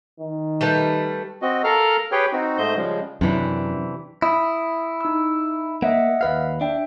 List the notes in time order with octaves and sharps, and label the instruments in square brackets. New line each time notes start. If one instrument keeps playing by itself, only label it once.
[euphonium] D#3
[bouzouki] G3 A3 B4
[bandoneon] C4 F#4 D#5
A4 A#4 F5 A#5 F6
G4 G#4 B4 C#5 G5
C4 D#4 F#4
G#2 A3 C5 D#5 G6
C#3 F3 G3 G#3
[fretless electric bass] F#2 [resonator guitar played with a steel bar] C3 E3 D4
[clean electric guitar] E4 [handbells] B5 D#6
[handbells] D#4 E6
[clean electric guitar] A#3 [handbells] D#5 E5 F#5
[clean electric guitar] D#2 B4 F5
[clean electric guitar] D4 [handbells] E5 G5